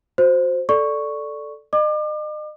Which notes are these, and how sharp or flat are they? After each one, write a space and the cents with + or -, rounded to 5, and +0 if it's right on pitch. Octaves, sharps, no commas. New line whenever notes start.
F#4 -20 C5 +0
A4 +0 D5 +0 C#6 +0
D#5 -35 D6 +30